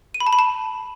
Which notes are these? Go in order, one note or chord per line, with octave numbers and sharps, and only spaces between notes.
D#7
B5
A5
B5
A5